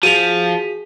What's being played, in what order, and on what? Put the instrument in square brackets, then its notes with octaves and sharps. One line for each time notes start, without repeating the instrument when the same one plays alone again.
[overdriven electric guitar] F3 [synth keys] F#4 G#4 B6 [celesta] D#7 F7